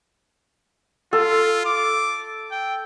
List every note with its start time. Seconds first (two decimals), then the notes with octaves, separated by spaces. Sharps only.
1.13 F4 A4
1.66 D6
2.52 G5